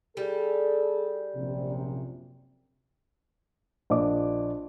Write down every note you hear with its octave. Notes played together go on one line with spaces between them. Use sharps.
G3 G#4 A4
A#1 F#2 C3
A#1 D4 D#5 D6